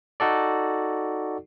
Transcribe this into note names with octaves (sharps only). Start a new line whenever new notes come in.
D#4 F#4 A4 D5